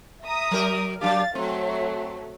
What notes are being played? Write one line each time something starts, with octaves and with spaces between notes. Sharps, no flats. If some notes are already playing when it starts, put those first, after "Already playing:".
E5 A#5 D#6
F#3 A#4
F#3 D4 G4 F5 A6
F#3 A3 C4